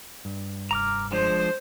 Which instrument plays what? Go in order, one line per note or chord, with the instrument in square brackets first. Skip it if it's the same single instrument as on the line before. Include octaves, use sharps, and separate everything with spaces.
[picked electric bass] G2
[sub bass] F1 [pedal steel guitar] A#5 D6 F6
[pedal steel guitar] F3 G#3 D4 [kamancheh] C5